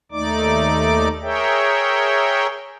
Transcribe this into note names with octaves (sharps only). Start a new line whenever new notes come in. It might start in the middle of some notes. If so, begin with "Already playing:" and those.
D#2 A3 D#4 D5 D6
G#4 A#4 C#5 E5 G5